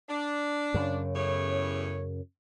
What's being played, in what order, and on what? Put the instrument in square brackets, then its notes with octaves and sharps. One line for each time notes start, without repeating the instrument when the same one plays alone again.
[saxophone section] D4
[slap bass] F#2 C#3
[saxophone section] E2 A2 C#5